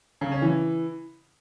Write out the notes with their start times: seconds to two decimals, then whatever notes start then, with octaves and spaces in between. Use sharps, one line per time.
0.21 C#3
0.32 C#4
0.42 E3